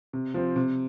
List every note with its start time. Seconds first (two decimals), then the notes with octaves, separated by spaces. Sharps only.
0.13 C3
0.34 F3 C4
0.56 C3